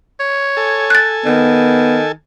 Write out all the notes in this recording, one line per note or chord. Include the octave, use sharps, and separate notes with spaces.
C#5
A4 G#5
F#6 A6
D#3 B3